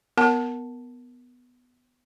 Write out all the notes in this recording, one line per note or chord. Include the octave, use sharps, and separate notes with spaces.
B3 A#4 A5